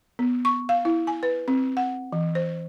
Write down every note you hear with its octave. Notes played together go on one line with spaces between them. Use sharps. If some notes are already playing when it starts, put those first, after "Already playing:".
B3
C#6
F5
E4
G#5
B4
C4
F#5
E3
C5